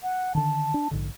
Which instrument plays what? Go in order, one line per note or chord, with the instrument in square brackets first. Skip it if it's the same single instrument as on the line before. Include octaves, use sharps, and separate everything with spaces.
[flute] F#5
[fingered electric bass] D3 D#3 [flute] A5
[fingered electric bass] D4
A#1 G#2 D3